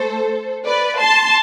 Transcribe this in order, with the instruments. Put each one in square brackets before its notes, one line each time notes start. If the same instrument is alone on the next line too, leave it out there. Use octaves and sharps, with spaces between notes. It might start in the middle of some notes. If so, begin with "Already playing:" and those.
Already playing: [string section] A3 A4 C5
B4 D5
A5 C6